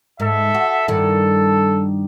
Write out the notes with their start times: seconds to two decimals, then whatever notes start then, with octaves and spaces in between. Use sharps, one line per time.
0.20 G#2 A4 E5
0.55 F#4
0.88 G2 D#3 E4 A4